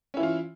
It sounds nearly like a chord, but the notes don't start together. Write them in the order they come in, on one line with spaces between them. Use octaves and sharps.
C#4 E4 E3 F4